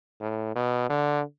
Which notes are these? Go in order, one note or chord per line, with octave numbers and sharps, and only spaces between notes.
A2
B2
D3